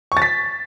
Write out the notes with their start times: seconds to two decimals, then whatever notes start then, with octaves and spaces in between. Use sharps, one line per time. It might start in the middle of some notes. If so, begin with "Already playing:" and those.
0.12 C#6
0.17 A6
0.22 B6